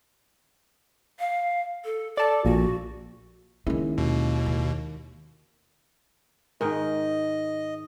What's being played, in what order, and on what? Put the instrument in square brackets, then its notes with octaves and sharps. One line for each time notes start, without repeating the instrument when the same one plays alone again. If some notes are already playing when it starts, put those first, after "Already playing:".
[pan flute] F5
A4
[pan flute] A4 [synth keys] D5 A5
[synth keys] A#1 A#2 [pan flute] F#4
[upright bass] D#3 C#4 [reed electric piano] G#3 A#3 E4
[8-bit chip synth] D#2 B2
[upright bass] D#3
[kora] G#2 D#3 [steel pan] D#4 A#4 [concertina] D#5